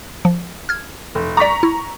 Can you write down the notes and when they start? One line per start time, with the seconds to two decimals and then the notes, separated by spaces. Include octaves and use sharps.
0.25 F3
0.69 F6 G#6
1.15 F1
1.37 D5 A#5 C#6 D6 B6
1.63 E4